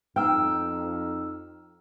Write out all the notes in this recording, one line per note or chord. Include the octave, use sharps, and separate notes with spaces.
F2 D#4 G5 E6 F6